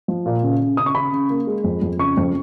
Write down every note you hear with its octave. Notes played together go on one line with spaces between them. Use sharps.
F3
A#2
C#3
C#3
C#3 D#6
C#6
C#3 B5
C#3
A#3
G#3
F2
F2
C#3 C#6
F2